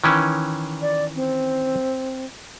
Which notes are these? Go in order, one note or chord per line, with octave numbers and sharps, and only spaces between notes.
D#3 E3 C#4
D5
C4